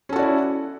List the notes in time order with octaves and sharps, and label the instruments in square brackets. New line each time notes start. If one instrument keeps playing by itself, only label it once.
[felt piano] C#4
A4
F#4
D5
E4